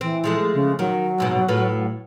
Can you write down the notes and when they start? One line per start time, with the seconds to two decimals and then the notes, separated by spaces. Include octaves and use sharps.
0.01 E3 C4
0.24 F3 G#3 A3
0.54 C#3
0.79 D#3 F#3
1.18 F2 G#2 B2
1.48 A2 F4 B4